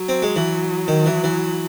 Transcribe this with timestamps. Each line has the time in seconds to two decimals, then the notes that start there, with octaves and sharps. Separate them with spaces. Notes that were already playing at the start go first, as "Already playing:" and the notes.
Already playing: F#3
0.09 C4
0.22 G#3
0.36 E3
0.88 D#3
1.06 E3
1.24 E3